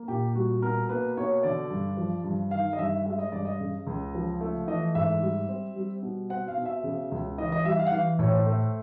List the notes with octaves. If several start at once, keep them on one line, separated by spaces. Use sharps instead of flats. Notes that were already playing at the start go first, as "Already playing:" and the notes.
Already playing: A#3
A#2 G4
G3 F#4
B2 A#4
A#3 B4
B2 C#5
D3 D5
G2
F3
G2
D#3 F5
D#5
G2 E5
G#3 E5
D#5
G2 D5
D#5
C#3
C#2
F3
A3
E3 D#5
G#2 E5
G3
C4
G3
B2
C4 F#5
F5
B2
E5
C#3
C#2
E3 D#5
D#5
G3 E5
F5
F#5
E3 F5
A2 C#5
C5
A3